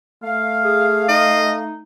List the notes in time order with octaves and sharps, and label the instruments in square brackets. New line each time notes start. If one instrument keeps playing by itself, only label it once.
[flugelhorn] A3 [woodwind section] F5
[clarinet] G#4
[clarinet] D#4 [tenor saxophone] D#5